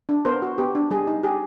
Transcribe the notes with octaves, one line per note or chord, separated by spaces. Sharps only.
D4
B3 A#4 C5
F#4
B3 G4
D4
G3 G#4
D#4
G4 G#4